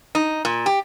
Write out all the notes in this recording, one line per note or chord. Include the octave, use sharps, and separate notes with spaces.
D#4
A#2
G4